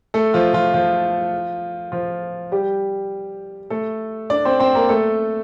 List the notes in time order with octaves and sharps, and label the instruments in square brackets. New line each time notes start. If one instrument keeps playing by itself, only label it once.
[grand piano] A3 A4
F3 F4
F3 F4
F3 F4
F3 F4
G3 G4
A3 A4
D4 D5
C4 C5
C4 C5
A#3 A#4
A3 A4